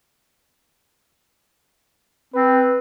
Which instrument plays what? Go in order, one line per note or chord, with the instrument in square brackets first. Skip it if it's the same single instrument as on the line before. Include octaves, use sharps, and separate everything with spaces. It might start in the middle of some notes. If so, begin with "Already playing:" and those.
[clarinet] C4 [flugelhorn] B4